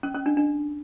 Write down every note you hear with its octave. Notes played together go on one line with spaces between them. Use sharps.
C#4
C#4
D4
D4